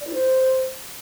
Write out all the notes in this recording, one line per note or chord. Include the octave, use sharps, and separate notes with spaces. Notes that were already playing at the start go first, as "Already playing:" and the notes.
D5
E4
C5